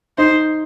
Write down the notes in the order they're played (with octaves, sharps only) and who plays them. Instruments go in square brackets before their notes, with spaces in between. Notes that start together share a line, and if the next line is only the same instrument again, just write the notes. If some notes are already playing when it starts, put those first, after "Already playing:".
[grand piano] D#4 [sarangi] C5